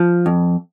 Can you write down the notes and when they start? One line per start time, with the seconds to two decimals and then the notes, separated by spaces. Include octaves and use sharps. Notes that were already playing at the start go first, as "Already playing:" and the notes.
Already playing: F3
0.26 F2